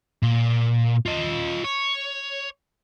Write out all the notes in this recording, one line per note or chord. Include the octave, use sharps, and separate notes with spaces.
A#2
F4 D#5
C#5